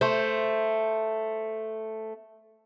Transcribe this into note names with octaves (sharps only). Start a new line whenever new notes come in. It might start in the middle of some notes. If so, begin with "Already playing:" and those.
A3 C5